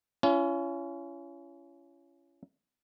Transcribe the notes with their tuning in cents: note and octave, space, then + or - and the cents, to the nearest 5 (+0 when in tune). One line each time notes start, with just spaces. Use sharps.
C#4 +20 F4 -45